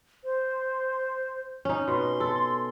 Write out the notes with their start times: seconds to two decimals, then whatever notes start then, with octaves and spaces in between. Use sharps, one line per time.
0.24 C5
1.65 C#4 D#4
1.88 B2 C6
2.20 A4